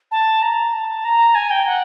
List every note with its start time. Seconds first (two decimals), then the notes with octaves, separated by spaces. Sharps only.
0.11 A5
0.42 A#5
0.73 A5
1.05 A#5
1.35 G#5
1.50 G5
1.66 F#5